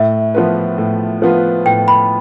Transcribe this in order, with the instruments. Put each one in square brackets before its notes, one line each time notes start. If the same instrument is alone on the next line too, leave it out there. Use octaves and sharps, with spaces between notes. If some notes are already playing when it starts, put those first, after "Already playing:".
Already playing: [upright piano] A2 [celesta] E5
[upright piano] F3 B3 F4 B4
A2
F3 B3 F4 B4
[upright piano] A2 [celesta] G5
[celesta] B5